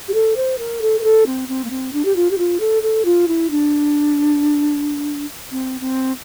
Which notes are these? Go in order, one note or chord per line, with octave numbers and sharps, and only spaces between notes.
G4
A4
C5
A#4
A4
A#4
A4
C4
C4
A#3
C4
D4
G4
F4
G4
F4
A4
A4
F4
E4
D4
C4
C4